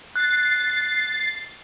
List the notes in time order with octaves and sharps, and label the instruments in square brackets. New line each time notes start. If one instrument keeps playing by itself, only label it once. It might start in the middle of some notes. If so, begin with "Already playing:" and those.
[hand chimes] F#6 [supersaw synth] A6 C7